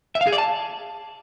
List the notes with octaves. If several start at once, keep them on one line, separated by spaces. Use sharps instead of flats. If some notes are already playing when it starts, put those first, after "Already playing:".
E5
F5
G#4
D5
A5